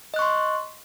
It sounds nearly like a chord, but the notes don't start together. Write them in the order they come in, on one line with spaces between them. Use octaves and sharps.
D#5 F#6 C#6 C6